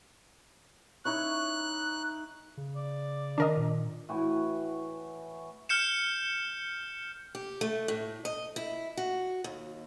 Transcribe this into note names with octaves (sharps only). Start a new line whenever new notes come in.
D#4 E4 C#5 F#6
C#3
D5
D#3 D4 A#4 D#5
A#2
A2 E3 F#4 G#5
F6 G6 C#7 E7
G4
A3
A2
D#5
E4
F#4
D#2